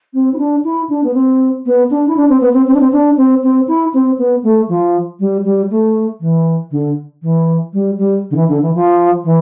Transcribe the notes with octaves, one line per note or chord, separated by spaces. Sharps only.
C4
E4
D4
E4
D4
B3
C4
B3
D4
E4
D4
C4
B3
C4
C4
D4
C4
D4
C4
C4
E4
C4
B3
A3
F3
G3
G3
A3
E3
D3
E3
G3
G3
D3
E3
D3
E3
F3
E3